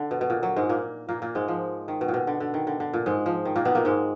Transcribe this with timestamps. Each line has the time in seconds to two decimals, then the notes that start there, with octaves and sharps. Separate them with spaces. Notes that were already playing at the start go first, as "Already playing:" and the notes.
Already playing: D3
0.11 B2
0.21 B2
0.30 A#2
0.43 F#3
0.56 G#2 G#3
0.69 A#2 A#3
1.09 A#2 A#3
1.22 A#2 A#3
1.35 G#2 G#3
1.48 F3
1.88 D#3
2.01 B2
2.08 A#2
2.14 B2
2.27 D3
2.40 D3
2.54 D#3
2.67 D3
2.80 D3
2.93 A#2
3.06 G#2 G#3
3.26 F3
3.45 D#3
3.56 A#2 A#3
3.65 B2 B3
3.75 A#2 A#3
3.85 G#2 G#3